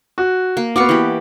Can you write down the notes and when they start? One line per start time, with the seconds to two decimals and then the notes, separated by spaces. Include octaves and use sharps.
0.18 F#4
0.57 A#3
0.76 B3 F#4 F5 C#6 D6
0.89 E3 G4